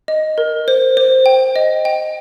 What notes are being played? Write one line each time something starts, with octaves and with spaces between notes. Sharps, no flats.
D#5
A#4
C5
C5
G5
D#5
G5